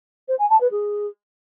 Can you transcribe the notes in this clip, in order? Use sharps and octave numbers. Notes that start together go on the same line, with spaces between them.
C5
G#5
A5
B4
G#4